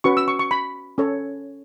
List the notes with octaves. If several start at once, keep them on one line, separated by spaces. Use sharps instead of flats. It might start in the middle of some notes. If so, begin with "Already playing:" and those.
C#4 F#4 B4 C#6
E6
C#6
C#6
B5
C#4 A4 C#5